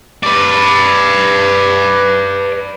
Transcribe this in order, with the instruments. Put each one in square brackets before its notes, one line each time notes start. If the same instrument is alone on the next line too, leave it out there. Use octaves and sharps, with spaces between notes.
[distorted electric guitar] B4 D5